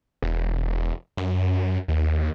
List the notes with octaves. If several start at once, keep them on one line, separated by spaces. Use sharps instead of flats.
E1
F#2
D#2